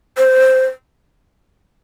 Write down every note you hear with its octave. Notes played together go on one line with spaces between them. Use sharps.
C5